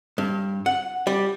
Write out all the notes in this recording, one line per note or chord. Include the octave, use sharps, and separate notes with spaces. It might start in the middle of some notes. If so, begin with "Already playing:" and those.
G2
F#5
G3